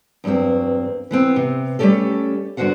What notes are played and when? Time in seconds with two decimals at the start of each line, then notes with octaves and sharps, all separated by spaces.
0.24 E2 G2 F#3 A#3 C4
1.11 E3 B3 C4
1.36 C3
1.79 G3 A3 C4 C#4 G4 A4
2.57 E2 G2 D3 F#4 C5 F#5